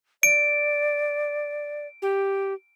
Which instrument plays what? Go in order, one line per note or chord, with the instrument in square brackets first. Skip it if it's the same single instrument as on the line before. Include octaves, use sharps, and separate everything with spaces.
[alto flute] D5 [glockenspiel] D7
[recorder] G4